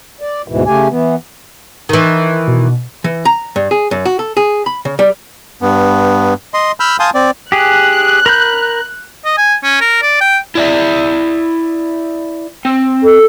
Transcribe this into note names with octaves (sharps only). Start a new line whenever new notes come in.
D5
D2 G#2 B2 E3
C#3 A3 G4 G#5
E3 B3
D#3 E3
B2
E3
A#5
G2
G#4
F#2
F#4
A4
G#4
B5
C#3
G3
G2 B3
D#5 C6
B5 E6 F6 G6
F5 G#5 A5 C6 D#6 G6
C4 D5
G4 G#4 F#6
A#4 B5 G6
D#5
G#5
C#4
A#4
D5
G5
E4 D5 E5
C4
A4